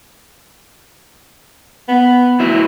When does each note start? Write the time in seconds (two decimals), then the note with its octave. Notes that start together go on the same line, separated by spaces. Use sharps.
1.88 B3
2.40 F#3 E4